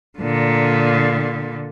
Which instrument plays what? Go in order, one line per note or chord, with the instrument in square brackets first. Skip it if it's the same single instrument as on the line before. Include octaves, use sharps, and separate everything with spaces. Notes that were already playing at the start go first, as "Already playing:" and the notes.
[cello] A#2 D3